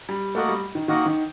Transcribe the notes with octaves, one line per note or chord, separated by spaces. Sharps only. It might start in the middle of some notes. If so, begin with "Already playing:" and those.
G3
A3 A#3 F#4 A#4 D#5 F#5
G3
D#3
D#3 A#3 F#4 A#4 D#5 F#5
D#3